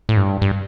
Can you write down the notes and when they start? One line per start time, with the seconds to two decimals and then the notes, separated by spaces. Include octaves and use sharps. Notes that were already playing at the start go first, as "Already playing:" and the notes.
0.09 A2
0.17 G2
0.42 G2